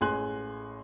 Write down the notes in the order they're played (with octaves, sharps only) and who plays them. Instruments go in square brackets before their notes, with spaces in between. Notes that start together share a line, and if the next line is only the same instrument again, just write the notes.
[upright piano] A1 G#3 G#5 C6 F#6 F#7